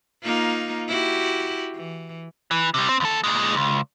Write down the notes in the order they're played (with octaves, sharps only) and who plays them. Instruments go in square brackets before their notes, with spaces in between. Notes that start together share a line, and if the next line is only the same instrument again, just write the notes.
[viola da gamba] A#3 D#4 F4
E4 F#4 G4
E3
[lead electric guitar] E3
C3 G3
C4
D#2 A4
A#2 G#3
C#2